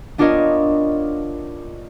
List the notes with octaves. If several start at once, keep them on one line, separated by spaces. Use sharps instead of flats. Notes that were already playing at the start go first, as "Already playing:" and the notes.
B3 D4 F4 A#4 C#5 D#5